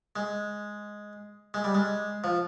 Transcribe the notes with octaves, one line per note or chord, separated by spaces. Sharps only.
G#3
G#3
G3
G#3
F3